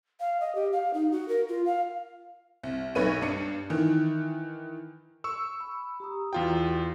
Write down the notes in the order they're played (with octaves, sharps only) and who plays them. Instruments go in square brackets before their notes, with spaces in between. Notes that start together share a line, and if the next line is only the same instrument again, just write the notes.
[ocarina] F5
D#5
G4
F5
D#4
F#4
A#4
F4
F5
[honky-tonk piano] C2
B1 D#4 B4 C#5 D#7
G2 D4 C#7
D#3 E3
[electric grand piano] C#6 E6
[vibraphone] B5
G4 A#5 D#6
[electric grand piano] E2 F4 G5 [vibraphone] F#4